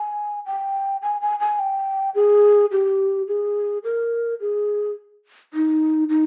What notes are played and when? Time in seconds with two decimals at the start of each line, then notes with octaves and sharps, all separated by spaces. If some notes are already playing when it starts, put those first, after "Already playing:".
Already playing: G#5
0.46 G5
1.02 G#5
1.21 G#5
1.40 G#5
1.59 G5
2.15 G#4
2.72 G4
3.28 G#4
3.84 A#4
4.40 G#4
5.54 D#4
6.09 D#4